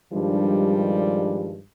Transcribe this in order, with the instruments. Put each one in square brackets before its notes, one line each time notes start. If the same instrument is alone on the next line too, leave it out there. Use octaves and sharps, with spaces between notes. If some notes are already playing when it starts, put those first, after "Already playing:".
[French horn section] G2 D#3 F3 G3 G#3 D4